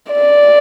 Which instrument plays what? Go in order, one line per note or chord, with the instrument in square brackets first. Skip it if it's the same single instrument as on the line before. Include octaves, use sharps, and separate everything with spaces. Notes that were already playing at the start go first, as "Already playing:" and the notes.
[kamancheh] D5